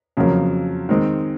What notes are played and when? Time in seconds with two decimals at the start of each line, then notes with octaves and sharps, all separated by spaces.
0.17 F2 C#3 F#3 A#3
0.89 D#3 G#3 C4